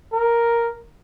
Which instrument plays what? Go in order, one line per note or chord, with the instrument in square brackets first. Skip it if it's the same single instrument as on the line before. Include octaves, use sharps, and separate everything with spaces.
[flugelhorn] A#4